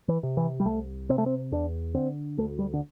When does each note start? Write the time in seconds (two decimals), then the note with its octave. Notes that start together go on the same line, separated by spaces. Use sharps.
0.08 E3
0.23 C3
0.37 E3
0.60 G3
0.65 C2 A3
1.09 C3 C4
1.18 A3
1.26 C4
1.52 E2 D4
1.94 D3 C4
2.38 D2 A3
2.59 G3
2.73 D3